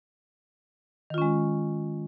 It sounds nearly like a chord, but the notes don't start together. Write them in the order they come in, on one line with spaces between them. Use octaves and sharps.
D#3 F4 C#4 G#3